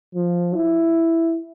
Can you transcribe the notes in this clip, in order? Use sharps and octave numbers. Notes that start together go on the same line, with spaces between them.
F3
E4